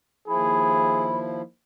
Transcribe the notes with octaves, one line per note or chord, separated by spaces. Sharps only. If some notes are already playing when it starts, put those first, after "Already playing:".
D#2 F3 E4 G#4 B5